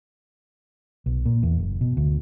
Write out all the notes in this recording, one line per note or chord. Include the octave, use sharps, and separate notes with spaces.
B1
A#2
E2
F#1
B2
D2